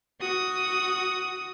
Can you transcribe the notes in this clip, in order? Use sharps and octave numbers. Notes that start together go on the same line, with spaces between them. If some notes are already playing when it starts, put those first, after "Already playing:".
F#4 D#6